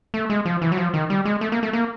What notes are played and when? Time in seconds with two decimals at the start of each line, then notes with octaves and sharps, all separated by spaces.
0.14 A3
0.30 G#3
0.45 F3
0.62 E3
0.72 F#3
0.78 F3
0.94 D#3
1.10 G3
1.25 G#3
1.41 A3
1.52 A#3
1.63 A3
1.73 A#3